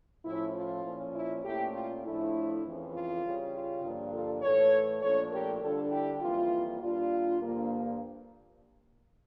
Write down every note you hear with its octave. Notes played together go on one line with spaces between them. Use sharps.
A2 F3 C#4 E4
F4
A#2 F3 C#4
E4
A#2 A3 C#4 E4 G4
F4
A2 F3 A3 D4 E4
F2 C#3 E3
F4
C#3 G3 C#4
F4
G2 D3 F3 A#3 D4
F4 A4
A2 E3 A3 A4 C#5
A#2 F3 A3 D4 A4 C#5
G4 A#4
D3 G3 D4 F4 A4
E4 G4
F2 E3 G3 A#3 F4
A#2 G3 D4 F4
G2 D3 F3 A#3